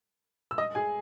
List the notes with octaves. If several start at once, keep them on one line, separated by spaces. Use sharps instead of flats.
E6
D#5 D#6
G#4 G#5